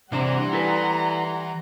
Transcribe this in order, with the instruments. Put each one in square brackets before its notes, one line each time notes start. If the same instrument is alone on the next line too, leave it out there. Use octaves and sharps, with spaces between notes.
[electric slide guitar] C3 D4 C5 [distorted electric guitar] E3 [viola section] G3 F#5 C6 [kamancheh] A#5
[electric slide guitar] E4 A4 B4